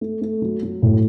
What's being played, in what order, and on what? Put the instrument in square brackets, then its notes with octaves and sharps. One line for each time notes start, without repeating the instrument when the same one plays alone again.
[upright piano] A3
A3
F#3
F#3
A2